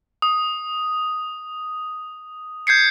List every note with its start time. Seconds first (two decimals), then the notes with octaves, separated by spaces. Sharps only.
0.22 D#6
2.67 G6 G#6 C7 C#7